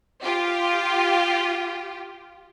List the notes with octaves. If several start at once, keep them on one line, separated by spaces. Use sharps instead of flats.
F4 G4